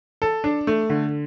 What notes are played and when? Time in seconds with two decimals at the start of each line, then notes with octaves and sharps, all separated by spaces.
0.22 A4
0.44 D4
0.67 A3
0.90 D3